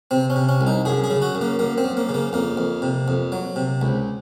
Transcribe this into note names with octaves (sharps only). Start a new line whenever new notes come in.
C3 C4
C#4
C3
C#4
C2
D#4
F#2 G#4
G#4
C#3
F#4
F#2
A#3
F#2 A#3
C4
F#2
A#3
C#3
A#3
F2 A#3
F2
C3
F2
F#3
C3
C#2